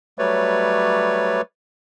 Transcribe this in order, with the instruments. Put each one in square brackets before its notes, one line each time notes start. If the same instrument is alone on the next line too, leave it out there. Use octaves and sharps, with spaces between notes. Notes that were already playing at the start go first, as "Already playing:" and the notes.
[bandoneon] F#3 G3 A3 B4 C#5 D5